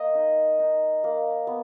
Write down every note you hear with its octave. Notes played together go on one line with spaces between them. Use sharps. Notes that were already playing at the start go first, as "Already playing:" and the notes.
Already playing: A#3 D#5
D#4
D#4
A#3
B3